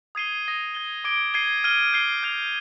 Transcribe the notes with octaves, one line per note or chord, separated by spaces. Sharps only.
D#6 G#6 C7 D#7 G7
D#6 A#6 D#7 G7
G#6 D#7 G7
D6 G#6 D7 G7
G#6 C7 D#7 G7
F6 G#6 D#7 G7
G6 C7 G7
G6 C7 F7